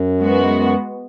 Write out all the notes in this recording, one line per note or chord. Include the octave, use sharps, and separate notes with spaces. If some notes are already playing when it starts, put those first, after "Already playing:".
Already playing: F#2
G#3 B3 F#4